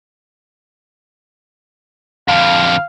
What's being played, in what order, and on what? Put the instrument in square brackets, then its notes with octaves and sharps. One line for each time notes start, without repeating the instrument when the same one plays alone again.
[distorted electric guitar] F2 D3 [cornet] F5